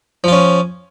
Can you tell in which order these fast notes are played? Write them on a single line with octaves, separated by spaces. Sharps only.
F3 F4 C#4